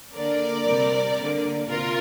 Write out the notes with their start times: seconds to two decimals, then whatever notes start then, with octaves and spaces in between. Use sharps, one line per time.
0.14 D3 A#3 A#4 D5
0.65 C3 G3 C4
1.17 D3 A#3
1.68 C3 F4 A#4